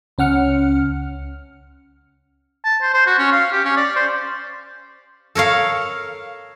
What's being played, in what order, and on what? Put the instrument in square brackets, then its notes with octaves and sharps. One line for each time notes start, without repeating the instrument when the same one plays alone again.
[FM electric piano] C#2 C#4 F#5 F6 C#7
[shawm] A5
C5
C5
F#4
C#4
F5
G4
C#4
D5
C5
[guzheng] A4 A#4 C#5 F5